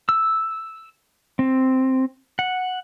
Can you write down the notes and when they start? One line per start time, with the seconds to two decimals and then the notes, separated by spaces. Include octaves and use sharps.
0.09 E6
1.39 C4
2.39 F#5